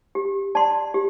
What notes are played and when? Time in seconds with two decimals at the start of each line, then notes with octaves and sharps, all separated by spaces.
0.15 G4
0.55 D5 A5 C6
0.94 G4